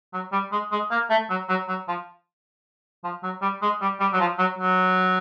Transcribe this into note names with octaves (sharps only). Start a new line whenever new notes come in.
F#3
G3
G#3
G#3
A#3
A3
F#3
F#3
F#3
F3
F3
F#3
G3
G#3
G3
G3
F#3
F3
F#3
F#3